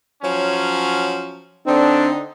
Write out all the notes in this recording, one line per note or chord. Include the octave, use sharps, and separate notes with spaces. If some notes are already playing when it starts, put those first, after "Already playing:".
F3 F#3 C#4
D3 C4 D4 D#4